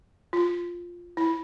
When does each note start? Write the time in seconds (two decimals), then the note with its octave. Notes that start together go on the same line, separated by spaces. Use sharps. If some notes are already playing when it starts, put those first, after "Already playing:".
0.33 F4
1.17 E4